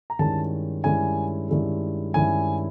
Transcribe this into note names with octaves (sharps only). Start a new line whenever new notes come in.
A#5
G2 D#3 G#3 C#4 E4 A5
G2 D#3 G#3 C#4 E4 G#5
G2 D#3 G#3 C#4 E4
G2 D#3 G#3 C#4 E4 G#5